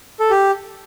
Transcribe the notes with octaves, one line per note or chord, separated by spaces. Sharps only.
A4
G4